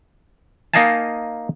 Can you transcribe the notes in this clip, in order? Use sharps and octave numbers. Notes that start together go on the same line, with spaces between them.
A#3 D#4 D#5 F5 G#5 A5